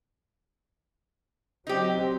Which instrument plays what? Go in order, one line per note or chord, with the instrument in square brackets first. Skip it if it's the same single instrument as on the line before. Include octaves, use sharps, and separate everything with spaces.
[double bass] F#3 C4 [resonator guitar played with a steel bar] D#4 G4